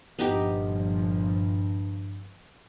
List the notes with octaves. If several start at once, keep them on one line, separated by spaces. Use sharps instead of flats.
G1 G2 A#2 F3 B3 D#4 G4